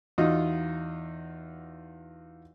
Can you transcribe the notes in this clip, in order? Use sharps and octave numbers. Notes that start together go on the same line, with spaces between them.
E2 D#4 F4 F#4 D#5